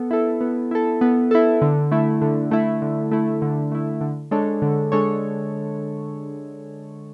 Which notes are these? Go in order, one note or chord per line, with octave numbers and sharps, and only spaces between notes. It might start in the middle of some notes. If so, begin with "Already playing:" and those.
Already playing: B3 A4
E4 A4
B3
E4 A4
B3
E4 A4
D3
A3 E4
D3
A3 E4
D3
A3 E4
D3
A3 E4
D3
G#3 D4 A4 C#5
D3
G#3 D4 A4 C#5